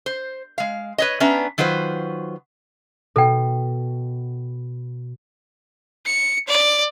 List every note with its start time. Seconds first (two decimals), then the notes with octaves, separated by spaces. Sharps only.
0.06 C5
0.58 G#3 F5
0.98 B4 C#5 D#5
1.20 B3 C#4 D4 B4 E5 A#5
1.58 D#3 F#3 F4 B4 C5
3.16 B2 A4 G5
6.06 C#7
6.48 D5